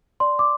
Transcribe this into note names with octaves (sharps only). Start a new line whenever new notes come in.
D5 C6
D6